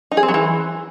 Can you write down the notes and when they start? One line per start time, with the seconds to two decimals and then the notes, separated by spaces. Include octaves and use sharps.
0.11 D#4
0.17 G#4
0.23 C4
0.28 F#3
0.34 E3